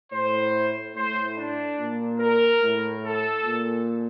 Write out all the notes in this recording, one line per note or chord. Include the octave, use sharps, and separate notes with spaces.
A2 C5
A2 C5
D4
A#2
A#4
A2
A4
A#2